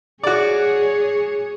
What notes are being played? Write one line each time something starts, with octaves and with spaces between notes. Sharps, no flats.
F#4 G#4 C#5 D5